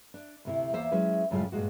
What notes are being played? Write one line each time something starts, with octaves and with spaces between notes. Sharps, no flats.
D4
D2 C3 E4
E2 A#3 C5 E5
F#3 G#3 C#4 E4 B4
F#2 A2 C#3 G3 G#3 F4
G2 A#2 G#3 F#4